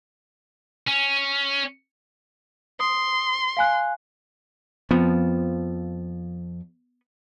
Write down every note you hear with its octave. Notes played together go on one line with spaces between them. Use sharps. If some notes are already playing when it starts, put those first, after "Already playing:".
C#4
C6 D#6
F5 G#5 F#6
F2 F3 B3